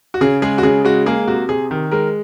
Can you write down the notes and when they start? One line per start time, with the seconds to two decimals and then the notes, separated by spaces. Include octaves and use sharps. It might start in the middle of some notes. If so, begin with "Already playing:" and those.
0.14 F#4
0.21 C#3 G#4
0.42 G#3 G#4
0.58 F#4
0.63 C#3 G#4
0.85 G#3 F#4
1.06 A#3 G#4
1.28 C3 F#4
1.49 C3 G#4
1.71 D#3
1.91 G#3 A#4